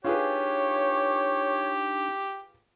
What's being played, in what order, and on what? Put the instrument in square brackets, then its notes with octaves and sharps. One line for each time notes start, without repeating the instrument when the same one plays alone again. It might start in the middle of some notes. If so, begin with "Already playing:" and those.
[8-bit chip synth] D4 D#4 [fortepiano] F4 G#4 B4 [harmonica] G4 [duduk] C#5